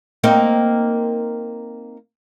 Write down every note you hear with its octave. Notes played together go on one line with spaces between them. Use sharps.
A#3 C4 D#4